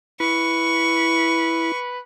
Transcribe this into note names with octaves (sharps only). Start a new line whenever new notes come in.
E4 B4 C#6